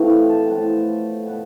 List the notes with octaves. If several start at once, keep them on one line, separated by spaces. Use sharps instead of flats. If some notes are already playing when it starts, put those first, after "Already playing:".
Already playing: A2 E3 A3 C4 F5
G5
A5
A2 F3 B3 A5
B2 B3